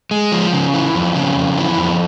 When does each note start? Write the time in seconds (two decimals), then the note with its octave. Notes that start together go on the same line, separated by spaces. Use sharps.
0.11 G#3
0.32 F3
0.53 C#3
0.74 E3
0.95 F2
1.15 C#3
1.36 F2
1.57 E3
1.78 F2